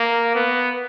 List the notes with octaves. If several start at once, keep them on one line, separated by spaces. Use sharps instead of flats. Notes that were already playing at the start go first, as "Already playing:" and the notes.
Already playing: A#3
B3